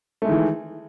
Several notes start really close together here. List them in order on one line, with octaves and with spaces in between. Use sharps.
A3 G#3 D#3 E3